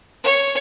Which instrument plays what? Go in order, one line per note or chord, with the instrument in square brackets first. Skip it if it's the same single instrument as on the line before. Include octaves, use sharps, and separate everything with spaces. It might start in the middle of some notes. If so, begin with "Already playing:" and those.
[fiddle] C#5